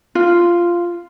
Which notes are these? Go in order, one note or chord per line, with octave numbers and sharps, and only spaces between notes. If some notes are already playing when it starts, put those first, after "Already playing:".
F4